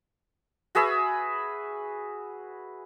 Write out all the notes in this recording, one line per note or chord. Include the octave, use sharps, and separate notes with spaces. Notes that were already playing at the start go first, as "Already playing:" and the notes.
F#4 G#4 B4 E5